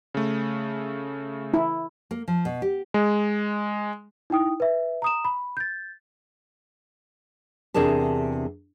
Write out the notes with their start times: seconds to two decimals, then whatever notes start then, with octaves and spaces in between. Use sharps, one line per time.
0.14 C#3 A3
1.54 E4
2.11 A#3
2.28 F3
2.45 B2
2.62 G4
2.94 G#3
4.30 D#4 E4 G5 D#6
4.60 B4 E5
5.02 A#5 D#6 E7
5.25 B5
5.57 G6 A6
7.74 E2 C3 D4 G#4 A#4 A5